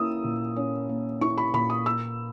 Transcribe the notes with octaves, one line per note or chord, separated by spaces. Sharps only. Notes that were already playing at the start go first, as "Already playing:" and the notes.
Already playing: A#3 C#4 E4 D#6 E6
A#2
C#4
A#3
E4 C#6
B5
A#2 B5
D#6
A#3 E6